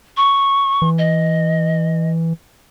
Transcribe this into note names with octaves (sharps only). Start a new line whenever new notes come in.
C#6
E3
D#5